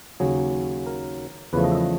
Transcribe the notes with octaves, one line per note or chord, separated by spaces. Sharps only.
D#2 C#3 F#3 G#4
A#4
E2 C#3 F3 A3 B4
D#5
E5
D#5